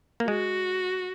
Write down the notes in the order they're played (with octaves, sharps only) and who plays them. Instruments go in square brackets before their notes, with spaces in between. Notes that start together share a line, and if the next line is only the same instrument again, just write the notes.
[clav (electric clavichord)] A#3
[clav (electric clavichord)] G#3 [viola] F#4